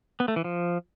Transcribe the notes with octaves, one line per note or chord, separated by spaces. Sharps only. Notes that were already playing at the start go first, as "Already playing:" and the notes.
B3
A3
E3
F3